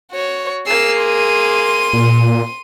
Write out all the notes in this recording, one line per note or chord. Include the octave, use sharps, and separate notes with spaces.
F#4 C#5
A#3 G#4 E6 C7
C6 D#7
A#2